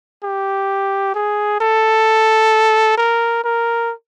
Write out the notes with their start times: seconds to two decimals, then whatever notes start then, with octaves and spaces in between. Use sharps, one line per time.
0.23 G4
1.15 G#4
1.61 A4
2.98 A#4
3.44 A#4